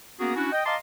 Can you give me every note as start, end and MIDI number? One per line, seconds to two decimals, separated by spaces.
0.20 0.33 58
0.20 0.33 59
0.20 0.33 61
0.20 0.33 66
0.20 0.33 68
0.20 0.33 70
0.36 0.50 61
0.36 0.50 62
0.36 0.50 64
0.36 0.50 66
0.52 0.66 75
0.52 0.66 79
0.66 0.76 75
0.66 0.76 77
0.66 0.76 81
0.66 0.76 82
0.66 0.76 84
0.66 0.76 86